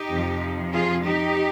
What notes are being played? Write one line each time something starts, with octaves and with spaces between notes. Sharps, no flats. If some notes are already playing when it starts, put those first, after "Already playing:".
Already playing: D#4 G4
F2 C3 F3
F4 G#4
D#4 G4